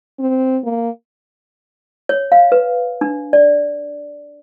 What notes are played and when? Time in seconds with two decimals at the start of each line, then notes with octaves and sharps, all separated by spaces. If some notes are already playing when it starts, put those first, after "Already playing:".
0.19 C4
0.64 A#3
2.09 C#5
2.32 F5
2.52 B4
3.01 D4
3.33 D5